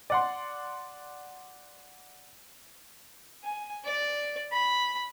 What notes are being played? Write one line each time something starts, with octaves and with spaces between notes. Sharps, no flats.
D5 F#5 C6
G#5
D5
B5